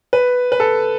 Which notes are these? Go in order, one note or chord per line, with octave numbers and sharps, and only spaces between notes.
B4
B4
A4